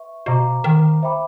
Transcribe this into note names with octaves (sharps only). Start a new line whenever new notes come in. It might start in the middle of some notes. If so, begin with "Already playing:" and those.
Already playing: B4 E5 C#6
B2 C5 F5 A#5 D6
D#3
C5 E5 G5 B5 D6